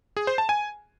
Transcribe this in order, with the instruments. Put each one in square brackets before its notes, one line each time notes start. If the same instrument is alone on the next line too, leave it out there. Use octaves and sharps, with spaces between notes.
[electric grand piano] G#4
C5
A5
G#5